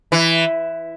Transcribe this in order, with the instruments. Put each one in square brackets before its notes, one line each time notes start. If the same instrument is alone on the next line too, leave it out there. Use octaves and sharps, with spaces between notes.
[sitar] E3